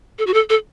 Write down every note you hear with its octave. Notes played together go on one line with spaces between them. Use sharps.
A4
F#4
A4
A4